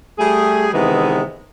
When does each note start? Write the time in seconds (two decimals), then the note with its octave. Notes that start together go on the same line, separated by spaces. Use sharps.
0.19 G3 A3 G#4
0.73 C3 D#3 E3 G#3 B3